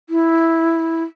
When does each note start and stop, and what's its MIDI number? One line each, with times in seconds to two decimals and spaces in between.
0.09 1.03 64